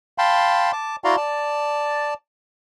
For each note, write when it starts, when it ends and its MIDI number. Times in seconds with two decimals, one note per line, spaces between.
0.18 0.72 77
0.18 0.72 79
0.18 0.72 81
0.18 0.72 83
0.18 0.72 84
0.72 0.96 81
0.72 0.96 86
1.04 1.16 64
1.04 1.16 66
1.04 1.16 74
1.04 1.16 77
1.04 1.16 82
1.04 1.16 84
1.17 2.14 74
1.17 2.14 81